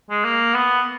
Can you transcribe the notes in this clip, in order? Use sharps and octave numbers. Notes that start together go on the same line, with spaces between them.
G#3
A#3
B3